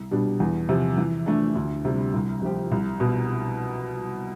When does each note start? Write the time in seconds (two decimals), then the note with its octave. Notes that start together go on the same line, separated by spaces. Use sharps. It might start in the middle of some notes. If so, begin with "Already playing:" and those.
Already playing: C2
0.11 B2 G3 D4
0.40 E2
0.69 C3 F3
0.98 E3
1.26 A3 D4
1.56 D2
1.85 C3 G3
2.14 C2
2.42 C3 F3 C4 G4
2.71 C2
3.00 B2